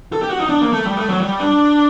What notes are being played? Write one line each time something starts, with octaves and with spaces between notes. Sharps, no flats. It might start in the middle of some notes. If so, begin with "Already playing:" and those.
A4
G4
F#4
D#4
D4
A#3
A3
G3
A3
F#3
G3
D4